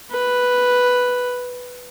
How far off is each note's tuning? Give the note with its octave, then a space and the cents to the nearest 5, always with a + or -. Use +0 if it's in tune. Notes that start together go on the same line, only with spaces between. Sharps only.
B4 +0